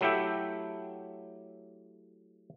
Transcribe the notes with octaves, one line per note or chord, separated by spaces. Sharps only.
F#3 A3 E4 G4 E5 G5